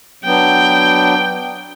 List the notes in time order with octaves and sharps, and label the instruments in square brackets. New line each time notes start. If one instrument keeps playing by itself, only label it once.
[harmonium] F#3 B3 D4 [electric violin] G5